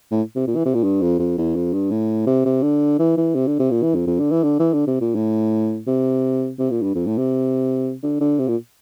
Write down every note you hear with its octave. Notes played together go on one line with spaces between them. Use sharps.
A2
C3
A#2
E3
C3
A#2
G2
F2
F2
E2
F2
G2
A2
C3
C3
D3
E3
E3
C3
D3
C3
A#2
E3
F2
F2
D3
E3
D3
E3
D3
C3
A#2
A2
C3
C3
A#2
G2
F2
A2
C3
D3
D3
C3
A#2